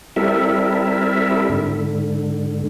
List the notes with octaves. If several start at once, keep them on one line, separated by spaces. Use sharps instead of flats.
G3 C4 E4 A4 A#4 E5
G#2 D3